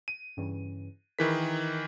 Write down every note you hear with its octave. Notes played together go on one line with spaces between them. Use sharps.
D#7
G2 C#3 E3
D#3 E3 E4 G#4 A#4 B6